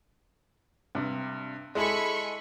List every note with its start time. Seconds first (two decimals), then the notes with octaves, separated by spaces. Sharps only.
0.95 G2 C3
1.75 G#3 E4 A4 G#5 B5 C#6